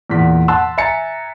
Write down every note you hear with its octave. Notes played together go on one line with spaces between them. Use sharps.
E2 A#2 B6
F#5 A5 C6 E6 F#6
E5 G#5 A#5 A6 C#7